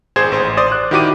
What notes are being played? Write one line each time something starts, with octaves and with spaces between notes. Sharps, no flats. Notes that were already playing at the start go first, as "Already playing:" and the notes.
G#1 G#4 C5 C6 G#6 E7
A1 C5
C5 D5 D#6
F#6
D#3 E4 F#4 G4 D6 D#7